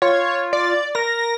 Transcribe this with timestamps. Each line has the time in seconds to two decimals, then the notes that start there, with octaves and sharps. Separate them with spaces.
0.02 F4 C#5
0.53 D5
0.95 A#4 A#6